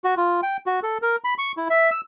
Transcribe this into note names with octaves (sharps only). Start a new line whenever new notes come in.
F#4
F4
G5
F#4
A4
A#4
B5
C#6
E4
E5
E6